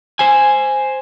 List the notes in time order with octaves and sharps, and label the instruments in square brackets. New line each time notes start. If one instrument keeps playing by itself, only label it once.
[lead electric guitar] C5 G#5